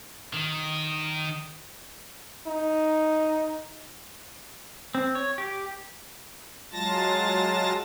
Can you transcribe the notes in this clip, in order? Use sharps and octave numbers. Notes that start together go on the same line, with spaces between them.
D#3
D#4
C4
C#5
G4
F#3 G#3 F4 A5 A6 A#6